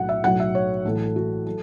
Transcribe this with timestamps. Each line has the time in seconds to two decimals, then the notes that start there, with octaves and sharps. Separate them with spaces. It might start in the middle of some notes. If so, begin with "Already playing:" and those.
Already playing: B1 A2 F#3 F#5
0.09 E5
0.24 B1 A2 F#3 F#5
0.40 E5
0.55 C#5
0.85 A1 A2 F#3 A4
0.95 A4
1.05 A4
1.16 F#4
1.46 F#3 A4